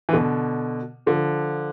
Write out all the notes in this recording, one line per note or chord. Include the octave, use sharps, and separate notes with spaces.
E3
B2 D3
D3 F3